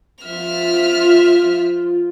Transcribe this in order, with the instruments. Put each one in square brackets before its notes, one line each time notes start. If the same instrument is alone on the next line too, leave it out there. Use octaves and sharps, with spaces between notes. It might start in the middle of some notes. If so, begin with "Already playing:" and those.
[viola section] F3 F4 [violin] E5 F6